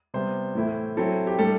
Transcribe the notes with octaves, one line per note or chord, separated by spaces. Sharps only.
C3 G3 B3 C5
A2 E3 A3 E4
F#3 C4 E4 A4
G4
A2 G3 D4 A4